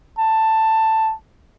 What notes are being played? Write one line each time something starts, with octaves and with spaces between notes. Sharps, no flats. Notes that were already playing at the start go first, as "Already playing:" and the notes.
A5